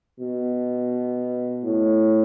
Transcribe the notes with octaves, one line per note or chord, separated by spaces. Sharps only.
B2
A2